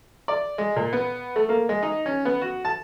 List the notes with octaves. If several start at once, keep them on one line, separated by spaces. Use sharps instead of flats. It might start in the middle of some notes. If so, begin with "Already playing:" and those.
D5
G#3
A#2
B3
A3
A#3
G#3
D#4
C#4
B3
F#4
A5